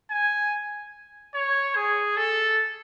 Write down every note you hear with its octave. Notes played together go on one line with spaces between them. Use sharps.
G#5
C#5
G#4
A4